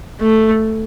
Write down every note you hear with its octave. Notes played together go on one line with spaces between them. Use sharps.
A3